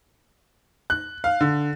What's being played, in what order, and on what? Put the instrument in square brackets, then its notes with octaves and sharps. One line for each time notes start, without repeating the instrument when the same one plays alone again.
[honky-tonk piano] F#6
F5
D3